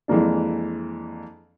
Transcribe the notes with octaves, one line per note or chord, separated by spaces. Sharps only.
F2 E3 G#3 A#3 D4